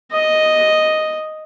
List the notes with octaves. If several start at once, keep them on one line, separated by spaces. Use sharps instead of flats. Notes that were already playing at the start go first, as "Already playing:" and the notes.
D#5